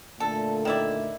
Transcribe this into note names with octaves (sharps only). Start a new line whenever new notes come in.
A#2 D3 A3 A4
D#3 E4 D5